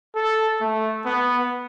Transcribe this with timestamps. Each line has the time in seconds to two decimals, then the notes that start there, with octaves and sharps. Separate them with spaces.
0.15 A4
0.61 A3
1.06 B3